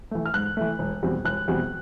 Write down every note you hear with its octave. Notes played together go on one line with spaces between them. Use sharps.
E3 A3
F6
G#2 F#6
E3 A3
E1
E2 B2 G3 C4
E1 F#6
E2 B2 G3 C4